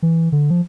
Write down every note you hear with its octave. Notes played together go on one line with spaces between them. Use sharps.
E3
D3
F3